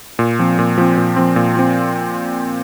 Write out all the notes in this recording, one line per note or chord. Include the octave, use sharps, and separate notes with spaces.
A#2
F3 C4
A#2
F3 C4
A#2
F3 C4
A#2
F3 C4